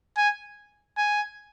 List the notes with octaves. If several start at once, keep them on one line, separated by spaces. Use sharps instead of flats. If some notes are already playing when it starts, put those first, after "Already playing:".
G#5
G#5